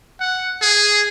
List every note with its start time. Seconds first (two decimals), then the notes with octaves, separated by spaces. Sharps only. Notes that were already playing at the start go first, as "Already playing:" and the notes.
0.20 F#5
0.62 G#4